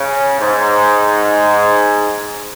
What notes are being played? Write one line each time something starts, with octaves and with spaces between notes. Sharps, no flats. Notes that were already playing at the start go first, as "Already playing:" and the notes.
Already playing: C#3
G#2